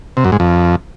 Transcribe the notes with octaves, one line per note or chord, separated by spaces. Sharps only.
C3
F#2
G#2
F2